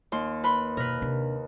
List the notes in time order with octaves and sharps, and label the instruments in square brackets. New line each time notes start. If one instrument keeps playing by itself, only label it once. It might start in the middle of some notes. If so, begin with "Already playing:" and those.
[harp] D#2 C6
B4 B5 C6
[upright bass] F#2 B2 [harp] A#4 B4
[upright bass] C3 D4